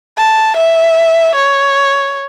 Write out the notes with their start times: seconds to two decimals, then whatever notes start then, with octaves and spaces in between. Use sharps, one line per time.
0.18 A5
0.57 E5
1.35 C#5